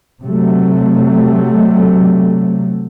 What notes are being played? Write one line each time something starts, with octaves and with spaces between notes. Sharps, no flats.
C3 F#3 A3